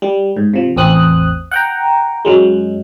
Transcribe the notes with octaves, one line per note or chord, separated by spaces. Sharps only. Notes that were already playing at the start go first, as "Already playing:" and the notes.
G3
G#2
C3 F3
A1 E2 C4 D#6 F#6
F#5 G5 A#5
F#2 F#3 G#3